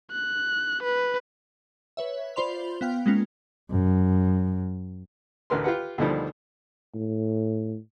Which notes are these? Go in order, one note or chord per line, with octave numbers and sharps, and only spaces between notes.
F#6
B4
B4 C#5 E5
F4 C5 D5 B5 C6 F7
B3 F5 G5 F6
G#3 A#3 B3 C#4 F4
F#2
A1 D2 D3 A#4 B4 C6
F4 G4 B4 F#5
D2 B2 D3 D#3 F3 G3
A2